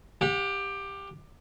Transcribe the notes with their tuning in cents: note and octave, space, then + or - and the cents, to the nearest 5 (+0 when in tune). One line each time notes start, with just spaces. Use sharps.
G4 +15 F#5 -35